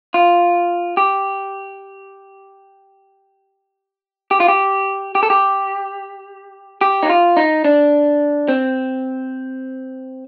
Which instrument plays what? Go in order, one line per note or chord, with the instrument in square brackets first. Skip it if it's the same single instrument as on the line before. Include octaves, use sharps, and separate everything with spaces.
[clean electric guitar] F4
G4
G4
F4
G4
G4
A4
G4
G4
D#4
F4
D#4
D4
C4